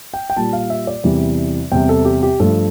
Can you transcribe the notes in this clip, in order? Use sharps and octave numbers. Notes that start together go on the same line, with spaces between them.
G5
G5
A#2 G3 A5
F5
E5
D5
E2 C3 E3 G3
E2 C3 G3 G5
A4
G4
G4
G2 F3 A3 A4